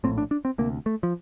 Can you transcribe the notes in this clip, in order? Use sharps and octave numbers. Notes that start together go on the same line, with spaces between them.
A#1 A2 C4
D4
D4
C4
D2 C3 A#3
A3
F3